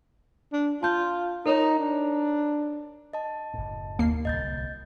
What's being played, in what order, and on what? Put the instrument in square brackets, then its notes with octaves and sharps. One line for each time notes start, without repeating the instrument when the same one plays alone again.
[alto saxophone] D4
[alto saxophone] F4 [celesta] A5 G6
[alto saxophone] D#4 [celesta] A#4 C#5 A#5
[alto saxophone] D4
[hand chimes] D#5 A5
[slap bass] F#1 A2
[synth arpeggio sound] D#2 A#3 C7
[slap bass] D1 C2 [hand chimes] D#5 G6 A6